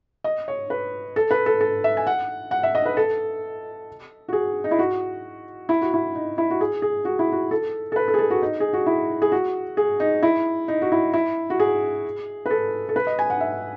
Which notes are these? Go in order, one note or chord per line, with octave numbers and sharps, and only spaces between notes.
D#5
C#5
B4
A4
B4
A4
A4
E5
G#5
F#5
F#5
E5
D#5
B4
A4
F#4
G#4
D#4
E4
F#4
E4
F#4
E4
D#4
E4
F#4
G#4
G#4
F#4
E4
F#4
A4
A4
B4
A4
G#4
A4
F#4
D#4
G#4
F#4
E4
G#4
F#4
G#4
D#4
E4
D#4
F#4
E4
E4
F#4
G#4
B4
A4
A4
B4
D#5
G#5
F#5
E5